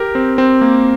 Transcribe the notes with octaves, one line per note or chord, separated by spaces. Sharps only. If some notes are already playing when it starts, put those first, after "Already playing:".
Already playing: G4 A#4
C4
C4
A#3